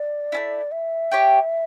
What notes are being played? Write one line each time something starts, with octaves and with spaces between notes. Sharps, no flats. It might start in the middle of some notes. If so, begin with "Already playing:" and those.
Already playing: D5
A3 C#4 E4
E5
G4 C#5 G5